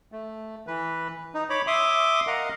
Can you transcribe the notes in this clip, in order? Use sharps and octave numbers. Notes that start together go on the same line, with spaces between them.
A3
E3 B4
D#4
C#5 B5 D6
E5 C6 D6 D#6
A#4 D#5 F5 F#5